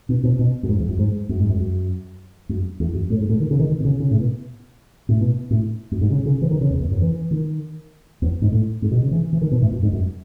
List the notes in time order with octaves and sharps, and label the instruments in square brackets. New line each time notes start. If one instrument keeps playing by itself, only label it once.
[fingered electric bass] B2
B2
B2
F#2
G#2
E2
F#2
G#2
F#2
G#2
F#2
F#2
F#2
E2
F#2
A2
G#2
A2
D#3
C#3
D#3
D#3
B2
C#3
C#3
A2
B2
A2
B2
A2
F#2
G#2
C#3
C#3
E3
D#3
C#3
E2
E2
F#2
E3
D#3
E2
G#2
A2
G#2
B2
C#3
E3
E3
D#3
B2
A2
F#2
G#2
F#2